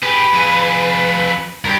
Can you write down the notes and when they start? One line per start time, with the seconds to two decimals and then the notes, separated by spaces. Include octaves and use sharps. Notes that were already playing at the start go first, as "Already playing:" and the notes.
0.03 G4 G#4 B4
0.34 F2 G#4
1.65 G2 G4 A#4